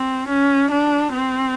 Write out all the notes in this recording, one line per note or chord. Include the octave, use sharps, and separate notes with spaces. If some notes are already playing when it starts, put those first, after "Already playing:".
Already playing: C4
C#4
D4
C4